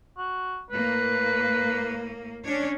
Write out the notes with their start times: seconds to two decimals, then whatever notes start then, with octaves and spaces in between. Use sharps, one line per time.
0.17 F#4
0.70 A2 A#3 B4
2.44 C#4 D4 C#5